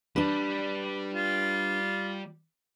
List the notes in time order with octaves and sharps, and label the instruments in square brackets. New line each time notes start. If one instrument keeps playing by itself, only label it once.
[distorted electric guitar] G3 [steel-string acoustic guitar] D4 B4
[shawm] F4